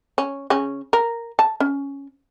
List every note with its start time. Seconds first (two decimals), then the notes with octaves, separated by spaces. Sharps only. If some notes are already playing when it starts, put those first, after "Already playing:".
0.18 C#4
0.50 C#3 C#4
0.93 A#4
1.39 A5
1.60 C#4